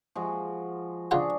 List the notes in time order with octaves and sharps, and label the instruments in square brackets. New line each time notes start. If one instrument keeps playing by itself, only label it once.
[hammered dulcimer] F3 G#3 F#4
[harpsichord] C#3 F4 F#5 [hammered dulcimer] D4 F#4 G#4